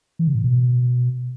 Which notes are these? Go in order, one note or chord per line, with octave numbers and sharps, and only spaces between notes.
E3
C#3
A2
B2